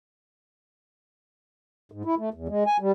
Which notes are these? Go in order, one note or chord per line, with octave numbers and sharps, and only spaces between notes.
G#2
E4
A3
E2
G#3
G#5
G3